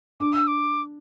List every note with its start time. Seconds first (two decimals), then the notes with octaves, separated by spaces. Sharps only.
0.20 D4 D6
0.33 E6
0.47 D6